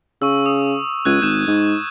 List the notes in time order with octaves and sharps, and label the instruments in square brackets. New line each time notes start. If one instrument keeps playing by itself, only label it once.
[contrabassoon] C#3 [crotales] C#6 E6
[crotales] D#6
[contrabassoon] C#2 [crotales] F#6 G#6 D#7
[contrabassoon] G#1 [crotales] G6 E7
[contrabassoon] G#2